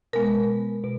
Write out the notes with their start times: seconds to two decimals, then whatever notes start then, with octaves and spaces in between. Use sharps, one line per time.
0.13 B2 G#3 B3 A#4
0.84 B2